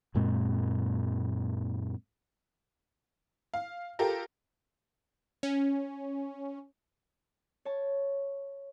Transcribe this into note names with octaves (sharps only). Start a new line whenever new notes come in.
F#2 A#2 G#3 C4
F5
F4 G4 A4 A#4
C#4
C#5 A5